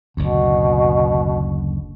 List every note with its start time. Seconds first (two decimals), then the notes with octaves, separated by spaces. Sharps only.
0.17 F#1 D2 B2